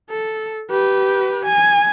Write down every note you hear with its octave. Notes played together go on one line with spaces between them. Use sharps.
A4
G4 B4
G#5